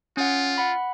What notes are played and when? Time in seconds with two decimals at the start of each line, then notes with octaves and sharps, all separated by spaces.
0.17 C#4 F4 F#5
0.58 F#5 B5